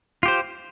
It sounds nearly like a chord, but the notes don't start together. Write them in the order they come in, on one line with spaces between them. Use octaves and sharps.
F4 G4 C5